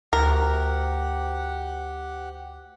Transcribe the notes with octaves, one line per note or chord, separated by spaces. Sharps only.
D2 G4 A#4 F#5